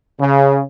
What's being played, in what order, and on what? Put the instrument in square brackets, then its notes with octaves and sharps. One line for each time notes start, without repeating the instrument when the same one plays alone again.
[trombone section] C#3